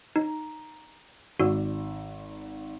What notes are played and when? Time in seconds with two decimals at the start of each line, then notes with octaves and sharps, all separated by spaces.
0.16 D#4 A#5
1.40 G#1 F#4 D5 E6